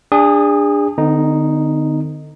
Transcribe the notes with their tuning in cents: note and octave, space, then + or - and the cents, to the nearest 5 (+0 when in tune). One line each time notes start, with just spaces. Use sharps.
D4 +0 G#4 -35 D#6 +0
D3 +30 C4 -45 D#4 +0